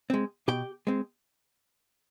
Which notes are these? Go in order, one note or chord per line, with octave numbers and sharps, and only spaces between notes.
G#3 C4
B2 G4 G5
G#3 C4